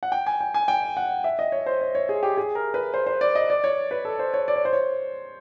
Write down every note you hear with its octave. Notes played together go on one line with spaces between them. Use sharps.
F#5
G5
G#5
G5
G#5
G5
F#5
E5
D#5
C#5
C5
C#5
C#5
G#4
G4
G#4
A#4
B4
C5
C5
D5
D#5
D5
C#5
B4
A4
C5
C#5
D5
C#5
C5
C#5